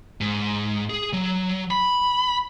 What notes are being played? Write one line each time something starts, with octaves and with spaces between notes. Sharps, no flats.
G#2
G#4
F#3
B5